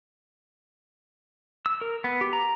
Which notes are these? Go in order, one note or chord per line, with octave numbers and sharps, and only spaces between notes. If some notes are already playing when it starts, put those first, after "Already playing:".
E6
A#4
B3
G4
A#5